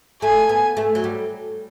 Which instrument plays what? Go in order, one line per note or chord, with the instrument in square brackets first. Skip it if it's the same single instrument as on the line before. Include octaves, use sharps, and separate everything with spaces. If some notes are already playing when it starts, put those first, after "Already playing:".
[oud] A3 [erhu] G#5
[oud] B3
A3
F#3
G3